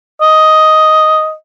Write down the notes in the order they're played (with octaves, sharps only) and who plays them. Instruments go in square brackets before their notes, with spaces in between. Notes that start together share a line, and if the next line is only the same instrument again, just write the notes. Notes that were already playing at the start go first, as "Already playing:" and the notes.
[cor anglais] D#5